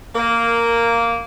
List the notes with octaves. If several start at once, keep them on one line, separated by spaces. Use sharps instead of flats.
A#3